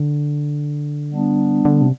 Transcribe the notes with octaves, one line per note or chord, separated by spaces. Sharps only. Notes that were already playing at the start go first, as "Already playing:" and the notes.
Already playing: D3
G3 B3 D4
D3
C3